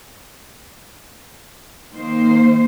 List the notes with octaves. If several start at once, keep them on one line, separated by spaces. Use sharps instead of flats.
D#3 A#3 C5